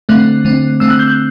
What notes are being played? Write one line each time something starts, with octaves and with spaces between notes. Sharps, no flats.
D3 A3 C4 F#6
D3 A3 C4
D3 A3 C4 E6
F#6
G6
F#6